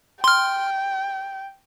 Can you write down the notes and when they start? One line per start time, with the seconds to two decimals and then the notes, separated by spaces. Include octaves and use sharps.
0.24 G5 C6 F6